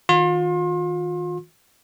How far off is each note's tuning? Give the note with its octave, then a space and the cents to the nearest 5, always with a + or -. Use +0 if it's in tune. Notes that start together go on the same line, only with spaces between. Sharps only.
D#3 +25 F4 +35 C6 +35